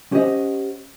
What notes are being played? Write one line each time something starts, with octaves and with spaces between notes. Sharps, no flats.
C#4 G4 C5 D#5 F#5